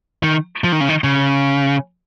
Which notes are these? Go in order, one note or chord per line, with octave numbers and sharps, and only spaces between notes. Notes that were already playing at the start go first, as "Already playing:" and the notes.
D#3
F3
D#3
C#3
D#3
C#3